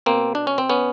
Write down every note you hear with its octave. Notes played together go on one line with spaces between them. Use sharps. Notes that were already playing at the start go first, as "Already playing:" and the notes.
B2 A#3 C4
D4
C#4
C4
B3 C#4